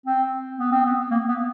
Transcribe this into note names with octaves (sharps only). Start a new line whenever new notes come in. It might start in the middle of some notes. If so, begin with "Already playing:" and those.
C4
B3
C4
B3
A#3
B3